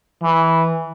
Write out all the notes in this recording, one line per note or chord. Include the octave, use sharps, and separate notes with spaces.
E3